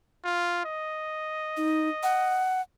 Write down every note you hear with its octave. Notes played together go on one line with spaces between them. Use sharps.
F4
D#5
D#4
F#5